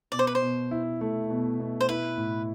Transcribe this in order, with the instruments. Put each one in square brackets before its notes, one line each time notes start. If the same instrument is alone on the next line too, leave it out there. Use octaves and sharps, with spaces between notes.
[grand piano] B2 [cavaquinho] D5
[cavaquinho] C5
B4
C5
[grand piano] B2
E4
A3
B2
B2
[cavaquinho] C5
[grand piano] E4 [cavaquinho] B4
[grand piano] A2